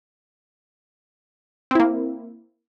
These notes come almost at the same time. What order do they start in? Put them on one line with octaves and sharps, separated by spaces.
C4 E4 A#3